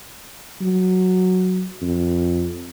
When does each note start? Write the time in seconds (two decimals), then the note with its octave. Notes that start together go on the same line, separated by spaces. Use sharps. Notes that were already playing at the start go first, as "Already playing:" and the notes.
0.61 F#3
1.81 F2